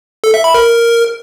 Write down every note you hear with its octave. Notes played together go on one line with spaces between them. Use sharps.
A4
E5
B5
A#4